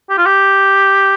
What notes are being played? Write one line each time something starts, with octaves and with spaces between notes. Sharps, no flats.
G4
F4
G4